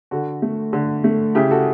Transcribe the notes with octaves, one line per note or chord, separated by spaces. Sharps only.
D3 F#4 A4
A3
D3
A3
C#3 E4 G4
F#4 A4